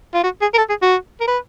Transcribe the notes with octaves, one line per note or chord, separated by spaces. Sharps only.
F4
F#4
G#4
A#4
A4
G#4
F#4
A#4
B4